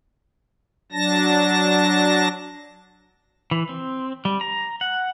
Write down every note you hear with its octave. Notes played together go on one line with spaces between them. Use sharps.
F#3 D4 A5 A#6
E3
C4
G3
A#5
F#5